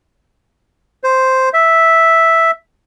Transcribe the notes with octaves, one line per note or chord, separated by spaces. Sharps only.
C5
E5